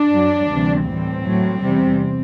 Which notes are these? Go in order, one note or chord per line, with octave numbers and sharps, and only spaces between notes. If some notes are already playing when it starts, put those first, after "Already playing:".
Already playing: D4
F#2 F#3
D2 C3 E3 G3
A2 E3 G3 C4
A2 F#3
E2 C3 G3